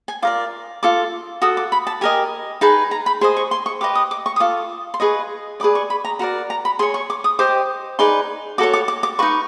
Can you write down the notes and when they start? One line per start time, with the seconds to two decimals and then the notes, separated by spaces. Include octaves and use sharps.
0.08 G#5
0.22 F4 A#4 D5 D6
0.83 F4 A4 D6
1.42 F#4 A4 D#6
1.57 D6
1.72 B5
1.87 A5
2.01 G4 A#4 D#5 G#5
2.61 D#4 G#4 B4 A5
2.91 A#5
3.06 B5
3.21 G#4 C5 D#5 C6
3.37 C#6
3.51 C6
3.66 C#6
3.81 G4 B4 D#5 D6
3.95 D#6
4.11 D6
4.26 C#6
4.36 D#6
4.40 F4 A4 D6
4.94 C6
5.00 G#4 B4 D#5 C#6
5.60 G#4 B4 D5 D6
5.75 C#6
5.90 B5
6.05 A#5
6.19 F#4 A#4 D5 A#5
6.50 A#5
6.65 B5
6.79 G#4 C#5 C6
6.94 C#6
7.10 D6
7.24 D#6
7.39 G4 C5 D#5 D6
7.99 D#4 G#4 B4 D5 C6
8.58 F#4 A4 C#5 D6
8.73 D6
8.88 D6
9.03 D6
9.19 F#4 B4 C#6
9.22 D#4